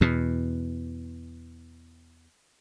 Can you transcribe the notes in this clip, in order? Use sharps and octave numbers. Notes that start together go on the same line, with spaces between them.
E2 B2